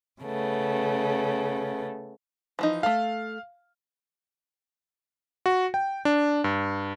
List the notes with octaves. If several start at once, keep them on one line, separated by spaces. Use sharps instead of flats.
C#3 A3 B3
E3 F3 D#4
A3 A4 F5
F#4
G5
D4
G2